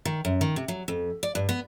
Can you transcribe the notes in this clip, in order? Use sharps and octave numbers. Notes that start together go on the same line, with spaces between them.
D#3
F#2
D#3
C3
F#3
F2
D5
G2
B3